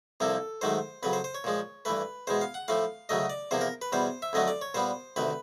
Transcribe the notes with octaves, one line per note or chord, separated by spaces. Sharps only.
C2 C3 F3 A#3 A4
G#2 D#3 F#3 A3 C5
F2 C#3 F#3 B4
C5
C5
C#5
A#2 F3 G#3
G2 E3 A3 B4
E2 B2 G#3 C5
F5
F#5
A2 F3 A3 F5
D2 C#3 F#3 A3 D#5
D5
E2 C3 F3 A#3 C5
A#4
B4
E2 B2 G3 C5
E5
F2 D3 F#3 A3 D#5
D5
C#5
A#2 G3 B3 C5
D2 C3 D#3 B4